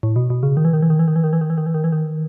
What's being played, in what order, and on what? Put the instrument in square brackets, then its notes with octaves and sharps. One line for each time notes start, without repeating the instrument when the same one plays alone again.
[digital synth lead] A2
B2
B2
C#3
D#3
E3
D#3
E3
D#3
E3
D#3
E3
D#3
E3
D#3
E3
D#3
E3
D#3
E3
D#3